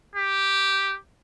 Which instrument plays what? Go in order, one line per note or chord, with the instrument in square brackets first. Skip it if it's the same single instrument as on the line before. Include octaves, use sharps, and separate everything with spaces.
[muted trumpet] G4